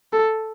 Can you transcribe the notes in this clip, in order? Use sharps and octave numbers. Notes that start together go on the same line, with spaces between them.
A4